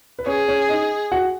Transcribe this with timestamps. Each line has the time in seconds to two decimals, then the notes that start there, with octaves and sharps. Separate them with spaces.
0.19 B4
0.26 C#4 G#4 C#5
0.48 C#4 C#5
0.69 D#4 D#5
1.12 F#4 F#5